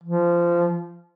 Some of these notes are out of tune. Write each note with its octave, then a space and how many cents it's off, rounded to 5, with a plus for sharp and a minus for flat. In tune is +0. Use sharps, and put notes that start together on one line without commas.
F3 -20